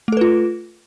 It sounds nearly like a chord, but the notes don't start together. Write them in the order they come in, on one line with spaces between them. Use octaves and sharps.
A3 A4 B4 F4